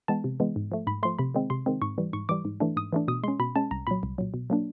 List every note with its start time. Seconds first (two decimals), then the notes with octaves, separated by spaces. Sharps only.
0.08 E3 G#3 B3 A5
0.24 C3
0.40 E3 G#3 B3
0.56 G#2
0.72 F3 A3
0.87 G#2 B5
1.03 F3 A3 C6
1.19 C3 B5
1.35 D#3 G#3 C4
1.50 C3 C6
1.66 D#3 G#3 C4
1.82 G#2 C#6
1.98 E3 G3
2.13 G#2 C#6
2.29 E3 G3 D6
2.45 G#2
2.60 E3 A3 D4
2.77 G#2 D#6
2.93 E3 A3 D4
3.08 B2 D#6
3.23 G#3 C#4 C6
3.40 B2 B5
3.56 G#3 C#4 A5
3.71 C2 A#5
3.87 A#2 F#3 B5
4.03 C2
4.18 A#2 F#3
4.34 B2
4.50 F#3 A#3 D4